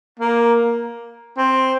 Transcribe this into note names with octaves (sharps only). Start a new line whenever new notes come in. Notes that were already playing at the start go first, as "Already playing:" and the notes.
A#3
C4